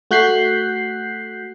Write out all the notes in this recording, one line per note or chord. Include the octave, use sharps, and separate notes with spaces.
A3 F#4 F#6 G6 B6 C7